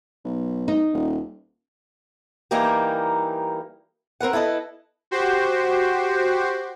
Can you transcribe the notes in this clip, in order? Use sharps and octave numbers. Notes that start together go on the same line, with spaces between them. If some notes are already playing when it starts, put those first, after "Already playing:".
B1
D#4
D#1
E3 G3 A#3 D#4 G4 A#4
C4 A#4 B4 F#5
E4 A4 B4 D#5
F#4 G4 C5